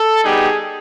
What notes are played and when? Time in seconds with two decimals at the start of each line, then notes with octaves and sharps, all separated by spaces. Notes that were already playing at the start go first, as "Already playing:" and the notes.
Already playing: A4
0.24 G3 B3 D#4 G4 G#4